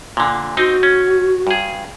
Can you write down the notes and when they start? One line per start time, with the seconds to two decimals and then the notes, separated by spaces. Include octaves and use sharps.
0.17 A#2 D3
0.57 C4 D#4 F#4
0.83 C#4
1.47 G2 G#4